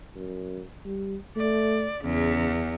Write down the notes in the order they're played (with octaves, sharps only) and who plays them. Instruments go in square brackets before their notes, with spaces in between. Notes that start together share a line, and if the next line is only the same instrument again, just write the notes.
[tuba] F#2
G3
[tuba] A3 [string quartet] D5
[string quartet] E2 [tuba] C#3